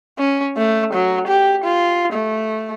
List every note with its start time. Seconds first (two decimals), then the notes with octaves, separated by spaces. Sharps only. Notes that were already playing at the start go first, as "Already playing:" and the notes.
0.18 C#4
0.57 A3
0.93 F#3
1.27 G4
1.65 F4
2.13 A3